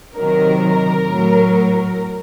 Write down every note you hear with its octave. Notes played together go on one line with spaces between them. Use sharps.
C3 D#3 F#3 A#4
A2 F#3